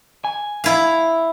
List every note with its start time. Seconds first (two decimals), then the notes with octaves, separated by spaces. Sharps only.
0.25 G#5
0.64 E4 F5